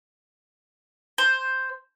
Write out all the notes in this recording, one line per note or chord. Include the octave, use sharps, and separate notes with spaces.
C5